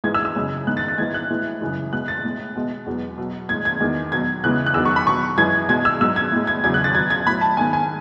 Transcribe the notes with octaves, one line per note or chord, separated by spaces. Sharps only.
G#2 E3 G#3 G#6
E6
E6
F#2 C#3 G#3
G#2 D#3 G#3 F#6
A6
A6
G#2 E3 G#3 G#6
F#6
A2 E3 G#3
F#2 C#3 E3 G#3
B2 G#3 F#6
A6
A2 G#3
B2 G#3
E2 B2 F#3
B2 F#3
A2 G#3 G#6
G#6
E2 D#3 G#3
B2 F#3 G#6
E2 C#3 E3 G#3 F#6
F#6
E2 D#3 F#3 E6
C#6
B5
B2 F#3 C#6
F#2 E3 G#3 G#6
B2 G#3 G#6
E6
G#2 F#3 E6
G#6
A2 G#3
G#6
E2 C#3 F#3 G#6
F#6
A6
B2 F#3 G#6
G#6
A2 F#3 B5
A5
G#2 D#3 G#3 G#5
G#5